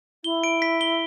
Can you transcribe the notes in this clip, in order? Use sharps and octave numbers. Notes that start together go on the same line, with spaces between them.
E4 G7
D7
B6
G7